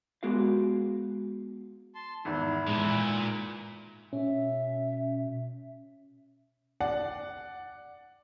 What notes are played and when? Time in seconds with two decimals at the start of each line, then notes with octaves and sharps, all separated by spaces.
0.23 G#3 B3 F#4 G4 A#4 F5
1.95 A5 C6
2.25 G#1 E2 G#2 E4
2.67 A2 E3 G#3
2.84 A#2
4.13 B2 C#4 E5
6.80 D5 F#5